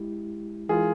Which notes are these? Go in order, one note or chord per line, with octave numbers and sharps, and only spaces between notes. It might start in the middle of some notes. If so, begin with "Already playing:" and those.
Already playing: G#3 E4 G4
E3 G#3 E4 F4 G#4 A#4